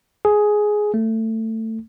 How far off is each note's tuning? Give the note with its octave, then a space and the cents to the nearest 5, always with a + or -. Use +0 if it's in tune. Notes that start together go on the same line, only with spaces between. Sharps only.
G#4 +10
A3 +20